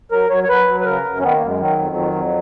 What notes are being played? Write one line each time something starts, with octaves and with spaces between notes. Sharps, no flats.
F#3 A#4
F#3 C#5
C#5
F#3 B4
F#3
B4
C#3 A#4
F#2
C#4
D#3 B3
A#3
F#2
G#3
D#3 F#3
F2
D#3
F2